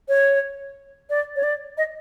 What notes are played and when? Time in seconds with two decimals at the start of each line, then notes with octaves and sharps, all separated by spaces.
0.08 C#5
1.10 D5
1.36 C#5
1.43 D5
1.78 D#5